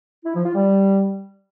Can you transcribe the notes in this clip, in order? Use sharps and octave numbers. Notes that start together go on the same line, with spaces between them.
E4
F3
F4
G3